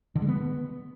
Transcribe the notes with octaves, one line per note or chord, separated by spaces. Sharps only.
D3
G#3
B3